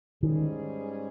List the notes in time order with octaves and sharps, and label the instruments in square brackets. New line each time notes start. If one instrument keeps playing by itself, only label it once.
[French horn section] G#2 G3 C#4 G#4 [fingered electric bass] D#3